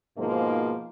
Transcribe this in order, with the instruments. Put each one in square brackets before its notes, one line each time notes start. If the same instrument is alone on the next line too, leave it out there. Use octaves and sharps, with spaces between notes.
[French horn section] G#2 B2 F3 G#3 A#3 D#4